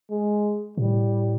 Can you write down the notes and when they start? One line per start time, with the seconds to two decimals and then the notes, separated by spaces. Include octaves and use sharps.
0.11 G#3
0.77 A2 G3